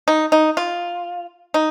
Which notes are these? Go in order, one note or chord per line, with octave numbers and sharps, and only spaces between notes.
D#4
D#4
F4
D#4